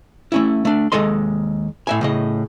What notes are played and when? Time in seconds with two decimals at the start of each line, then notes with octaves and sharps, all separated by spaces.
0.32 A3 C#4 E4
0.65 A3 D4
0.92 D#2 E3 G#3 A4 D#5 C6
1.87 A2 E5 G#5
2.01 A2 C#3 D#5